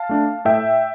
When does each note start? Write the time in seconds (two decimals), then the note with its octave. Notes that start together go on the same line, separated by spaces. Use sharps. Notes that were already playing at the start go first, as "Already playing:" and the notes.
Already playing: F5 A5
0.09 A3 D4
0.45 A2 E5 G5